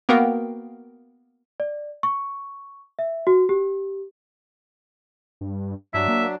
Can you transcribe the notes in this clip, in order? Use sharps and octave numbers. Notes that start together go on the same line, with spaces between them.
A#3 B3 F#4 A#4 F5 G5
D5
C#6
E5
F#4
G4
G2
G2 F#3 D4 E5
A#3